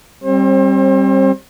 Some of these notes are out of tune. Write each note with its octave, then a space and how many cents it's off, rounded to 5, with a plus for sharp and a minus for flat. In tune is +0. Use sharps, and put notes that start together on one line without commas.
G3 +0 C4 +35 C5 +45